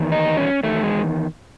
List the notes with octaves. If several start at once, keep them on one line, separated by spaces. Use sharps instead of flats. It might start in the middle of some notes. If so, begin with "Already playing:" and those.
Already playing: E2 D#3
D#4
C#4
E2 D#3 A3
G#3